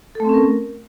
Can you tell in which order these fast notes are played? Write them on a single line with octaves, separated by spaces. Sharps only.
A4 A3 C4 C#4 A#4